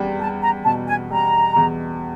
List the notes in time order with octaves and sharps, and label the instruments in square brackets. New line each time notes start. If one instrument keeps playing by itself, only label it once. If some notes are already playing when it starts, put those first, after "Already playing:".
Already playing: [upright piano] E2 G3
[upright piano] G3 [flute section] A5
[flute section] A#5
[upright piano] B2 [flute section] A5
[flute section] G#5
[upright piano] G3 [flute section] A#5
[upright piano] E2